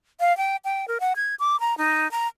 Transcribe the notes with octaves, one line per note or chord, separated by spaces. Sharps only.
F5
G5
G5
A#4
F#5
G#6
D6
A#5
D#4
A#5